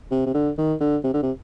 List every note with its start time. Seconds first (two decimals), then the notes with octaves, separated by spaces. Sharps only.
0.11 C3
0.26 C3
0.34 D3
0.58 D#3
0.80 D3
1.03 C3
1.14 D3
1.22 C3